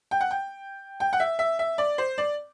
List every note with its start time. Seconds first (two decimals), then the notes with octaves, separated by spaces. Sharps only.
0.11 G5
0.21 F#5
0.31 G5
1.00 G5
1.13 F#5
1.20 E5
1.39 E5
1.59 E5
1.78 D5
1.98 C5
2.18 D5